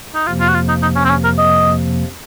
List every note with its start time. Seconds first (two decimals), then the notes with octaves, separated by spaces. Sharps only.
0.15 D#4
0.26 F2 C3 F3 A#3 F4
0.40 F4
0.48 F#4
0.54 F4
0.68 D#4
0.82 D#4
0.96 C#4
1.05 C4
1.09 C#4
1.24 A#4
1.38 D#5